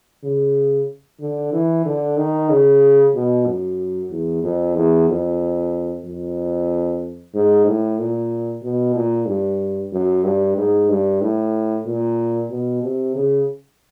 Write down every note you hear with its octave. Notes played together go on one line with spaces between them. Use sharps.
C#3
D3
E3
D3
D#3
C#3
B2
F#2
E2
F2
E2
F2
F2
G#2
A2
A#2
B2
A#2
G2
F#2
G2
G#2
G2
A2
A#2
B2
C3
C#3